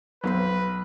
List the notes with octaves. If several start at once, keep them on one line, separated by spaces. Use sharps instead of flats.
B1 F#3 B3 B4 C5